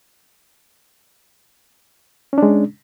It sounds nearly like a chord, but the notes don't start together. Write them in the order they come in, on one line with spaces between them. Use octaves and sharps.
C#4 D4 G#3